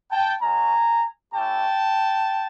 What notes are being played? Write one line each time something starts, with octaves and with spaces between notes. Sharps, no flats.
G5 A5
G#3 C#4 F#4 G#5 A#5
A3 C#4 E4 G4 G5 A5